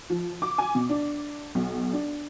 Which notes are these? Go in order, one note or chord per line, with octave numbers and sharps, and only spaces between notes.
F3
D6
G#5
B2
D4
B1
D4